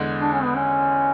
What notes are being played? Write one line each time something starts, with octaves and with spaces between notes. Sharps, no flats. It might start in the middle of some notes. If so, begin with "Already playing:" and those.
Already playing: E2 D3 G#3
D4
C#4
B3
C#4